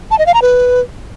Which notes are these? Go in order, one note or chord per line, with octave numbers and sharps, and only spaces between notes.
A5
D#5
F5
A#5
B4